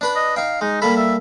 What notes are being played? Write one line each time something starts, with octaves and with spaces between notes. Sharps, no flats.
D4 B4 B5
D#5
D#4 F5 G5
G#3 D#4
G3 A#3 A4 B5
E5